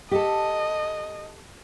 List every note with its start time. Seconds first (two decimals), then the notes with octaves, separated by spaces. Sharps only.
0.11 G4 A4 D#5